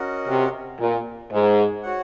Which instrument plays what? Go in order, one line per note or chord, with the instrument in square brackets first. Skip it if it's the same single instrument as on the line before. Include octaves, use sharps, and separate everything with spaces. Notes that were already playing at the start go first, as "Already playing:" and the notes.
Already playing: [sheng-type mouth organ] C#4 F#4 A#4 D#5 F#5
[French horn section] C3
A#2
G#2
[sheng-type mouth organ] F#4 C#5 F#5